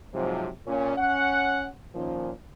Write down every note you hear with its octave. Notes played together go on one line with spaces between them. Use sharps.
G#2 C3 F3 F#3
A#2 C#4
C#4 F#5
A#2 D#3 F3 C#4